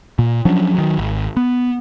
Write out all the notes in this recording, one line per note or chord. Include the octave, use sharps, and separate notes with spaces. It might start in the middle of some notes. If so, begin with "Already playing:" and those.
A#2
F3 F#3 C#4 D4
D#3 F#3
G#1
B3